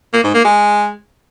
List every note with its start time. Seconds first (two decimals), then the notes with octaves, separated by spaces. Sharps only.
0.13 A#3
0.24 G#2
0.34 A#3
0.45 G#3